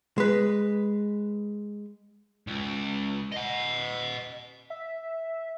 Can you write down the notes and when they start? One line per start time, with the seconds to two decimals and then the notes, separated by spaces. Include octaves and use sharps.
0.18 G#3 B4
2.47 C#2
3.32 D#5 F#5
4.70 E5